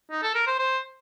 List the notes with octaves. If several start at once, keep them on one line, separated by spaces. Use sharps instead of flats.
D#4
A4
A#4
C5
C5